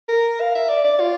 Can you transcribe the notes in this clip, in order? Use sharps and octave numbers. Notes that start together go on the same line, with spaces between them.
A#4
F5
E5
D5
D5
F4